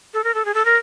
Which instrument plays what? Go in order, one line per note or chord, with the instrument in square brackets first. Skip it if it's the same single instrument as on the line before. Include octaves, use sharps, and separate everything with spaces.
[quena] A4
A#4
A4
G#4
A4
A#4